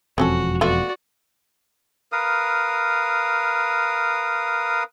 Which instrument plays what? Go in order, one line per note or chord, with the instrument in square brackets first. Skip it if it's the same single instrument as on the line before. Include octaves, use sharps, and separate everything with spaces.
[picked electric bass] E1 F2 [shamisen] C4 C#4 A4 [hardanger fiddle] F#4
[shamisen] A3 B3 F4 [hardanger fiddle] F#4 D5
[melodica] A#4 B4 F5 D#6